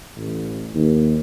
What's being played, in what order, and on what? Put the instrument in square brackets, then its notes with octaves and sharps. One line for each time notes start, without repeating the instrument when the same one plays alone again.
[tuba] A1
D#2